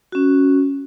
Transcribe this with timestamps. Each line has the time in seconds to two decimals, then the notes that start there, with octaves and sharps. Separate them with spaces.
0.12 C#4 F#4